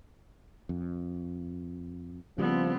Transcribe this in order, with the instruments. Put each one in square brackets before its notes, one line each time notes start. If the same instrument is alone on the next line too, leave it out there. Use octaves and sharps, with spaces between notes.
[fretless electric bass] F2
[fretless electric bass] C#3 G3 [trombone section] F3 [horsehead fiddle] B3 C4